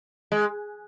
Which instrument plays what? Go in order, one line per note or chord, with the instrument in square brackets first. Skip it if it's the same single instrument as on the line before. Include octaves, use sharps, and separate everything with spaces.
[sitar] G#3